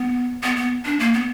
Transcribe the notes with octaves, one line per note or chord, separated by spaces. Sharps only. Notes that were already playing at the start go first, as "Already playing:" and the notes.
Already playing: B3
B3
B3
D4
A#3
B3